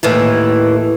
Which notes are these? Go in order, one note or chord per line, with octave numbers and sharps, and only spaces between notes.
D#2 A2 E3